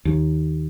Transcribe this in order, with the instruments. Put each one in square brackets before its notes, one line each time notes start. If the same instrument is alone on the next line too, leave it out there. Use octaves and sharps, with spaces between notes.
[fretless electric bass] D#2